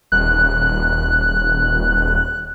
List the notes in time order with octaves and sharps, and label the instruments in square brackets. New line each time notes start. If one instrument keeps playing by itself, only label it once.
[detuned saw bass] D#1 [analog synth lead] F#6